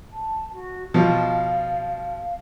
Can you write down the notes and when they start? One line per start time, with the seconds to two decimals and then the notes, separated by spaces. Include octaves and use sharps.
0.12 A5
0.51 F#4
0.94 B2 F3 F5